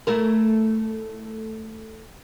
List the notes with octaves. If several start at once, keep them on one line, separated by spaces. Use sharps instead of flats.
A3 E4 A#4